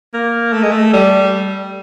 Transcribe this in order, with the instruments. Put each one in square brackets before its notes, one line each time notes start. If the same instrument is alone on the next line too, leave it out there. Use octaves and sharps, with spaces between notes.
[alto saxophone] A#3
A3
G#3
A3
G3